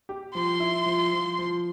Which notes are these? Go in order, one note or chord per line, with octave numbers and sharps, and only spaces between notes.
G4
F3 C6
E4
F3
F3
F3